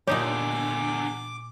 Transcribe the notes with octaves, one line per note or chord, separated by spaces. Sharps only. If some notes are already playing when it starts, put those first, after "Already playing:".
E2 A#2 D3 F#3 D#4 G4 D6 G6